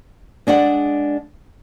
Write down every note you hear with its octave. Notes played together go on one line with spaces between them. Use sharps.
G#3 D4 D5 F#5